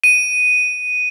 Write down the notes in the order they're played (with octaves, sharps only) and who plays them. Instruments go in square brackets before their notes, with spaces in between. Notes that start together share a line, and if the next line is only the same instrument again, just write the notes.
[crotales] D#7